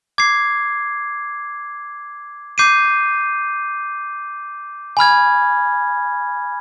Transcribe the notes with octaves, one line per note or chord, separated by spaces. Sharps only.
D6 G#6 C7
D6 G6 C7 D#7
G#5 B5 F6 G#6